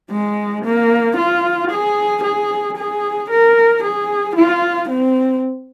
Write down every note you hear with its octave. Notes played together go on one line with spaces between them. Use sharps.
G#3
A#3
F4
G#4
G#4
G#4
A#4
G#4
F4
C4